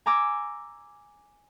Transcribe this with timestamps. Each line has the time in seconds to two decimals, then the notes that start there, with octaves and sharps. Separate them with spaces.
0.06 G#5 A#5 D6 E6 G#6